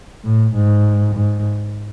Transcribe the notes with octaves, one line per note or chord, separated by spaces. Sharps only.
A2
G#2
G#2